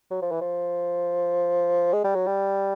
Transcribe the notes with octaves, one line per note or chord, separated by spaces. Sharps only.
F#3
F3
E3
F3
G#3
G3
F#3
G3